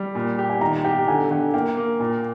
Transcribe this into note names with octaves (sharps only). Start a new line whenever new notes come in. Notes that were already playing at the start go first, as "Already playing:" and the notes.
Already playing: G3
A#2
G4
G#5
D#3 A#5
G4 G5
D3 G#5
D3 G5
A#3 G5
A#3
A#2